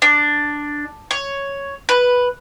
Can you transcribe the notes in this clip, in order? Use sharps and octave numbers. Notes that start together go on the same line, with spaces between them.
D4
C#5
B4